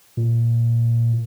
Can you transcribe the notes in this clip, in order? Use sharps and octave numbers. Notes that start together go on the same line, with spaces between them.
A#2